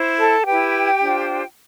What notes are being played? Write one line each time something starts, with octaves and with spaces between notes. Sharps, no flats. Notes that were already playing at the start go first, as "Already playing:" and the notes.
Already playing: E4 C5
A4 A5
E4 G4 B4 G5
D4 F4 C5